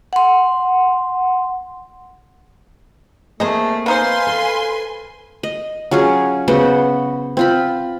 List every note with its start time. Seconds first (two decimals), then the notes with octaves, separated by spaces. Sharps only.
0.13 F#5 C6
3.40 F#3 A3 A#3 C4 G#4 C5 D#5
3.86 B3 D#4 B4 C5 F5 G#5 C6
4.27 A4
5.43 D#5
5.91 F#3 C#4 F4 G#4
6.48 C#3 B3 F#4 C5
7.37 C4 F4 B5